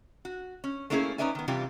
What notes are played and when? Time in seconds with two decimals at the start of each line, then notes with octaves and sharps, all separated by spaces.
0.25 F#4
0.64 C#4
0.90 A3 A#3 C#4 E4 G4 G#4
1.18 C#4 D#4 B4 D5 E5 G#5
1.35 D#3 B3
1.48 C3 E3 G3 F4 G4